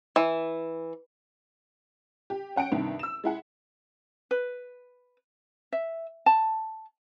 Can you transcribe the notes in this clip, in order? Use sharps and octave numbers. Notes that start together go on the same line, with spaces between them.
E3
G4
C#4 F#5 G5 D7
C2 G2 D#3
E6 E7
G#3 E4 F#5
B4
E5
A5